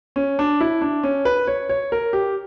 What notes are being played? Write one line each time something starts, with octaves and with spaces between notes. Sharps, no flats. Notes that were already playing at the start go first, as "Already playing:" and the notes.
C#4
D4
E4
D4
C#4
B4
C#5
C#5
A#4
G4